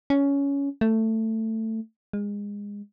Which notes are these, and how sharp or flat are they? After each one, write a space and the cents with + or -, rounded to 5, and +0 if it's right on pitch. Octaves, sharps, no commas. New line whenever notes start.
C#4 +15
A3 +15
G#3 -25